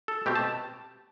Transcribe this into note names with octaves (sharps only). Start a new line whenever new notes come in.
A4
B2 A3 C4 G4
A5